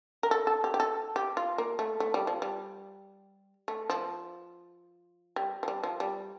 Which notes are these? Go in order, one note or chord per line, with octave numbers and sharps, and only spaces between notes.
A#4
A4
A4
G4
G4
A4
G4
F4
A#3
A3
A3
G3
F3
G3
A3
F3
G3
F3
G3
F3
G3